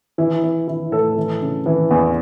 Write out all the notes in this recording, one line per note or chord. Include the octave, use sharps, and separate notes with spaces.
E3 E4
E3
E3 E4
A2 A4
E3
C#3
E3
E2